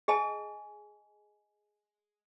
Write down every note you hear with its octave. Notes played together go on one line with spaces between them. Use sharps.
G#4 D#5 G#5 A5